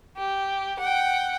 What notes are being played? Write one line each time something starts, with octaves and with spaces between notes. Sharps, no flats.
G4
F#5 G5